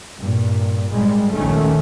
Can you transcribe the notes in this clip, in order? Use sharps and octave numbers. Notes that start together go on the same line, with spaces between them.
G2 A#2
G#1 G3 G#3
A#1 D#2 D#3 A3 C#4